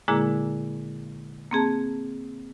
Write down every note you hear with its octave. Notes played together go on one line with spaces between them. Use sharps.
A#2 D3 G#3 A#3 E4 G#4
A#3 C4 G#4 A5